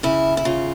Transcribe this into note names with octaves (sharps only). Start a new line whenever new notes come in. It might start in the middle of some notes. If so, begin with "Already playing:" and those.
C#3 E4
E4
C#3 F4